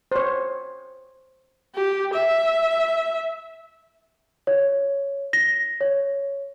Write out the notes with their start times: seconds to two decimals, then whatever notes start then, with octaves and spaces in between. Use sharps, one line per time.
0.12 C5 C#5
1.75 G4
2.14 E5
4.47 C#5
5.33 A#6
5.81 C#5